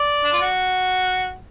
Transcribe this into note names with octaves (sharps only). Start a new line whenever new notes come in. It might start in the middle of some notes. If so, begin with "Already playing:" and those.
Already playing: D5
D4
F4
F#4